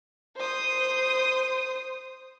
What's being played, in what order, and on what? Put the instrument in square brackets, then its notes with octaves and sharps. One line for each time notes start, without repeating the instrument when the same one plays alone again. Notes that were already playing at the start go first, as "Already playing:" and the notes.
[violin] C5 D#6